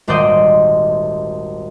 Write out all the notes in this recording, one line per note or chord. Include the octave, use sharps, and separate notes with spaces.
D#1 G#1 C5 D5 D#5 G6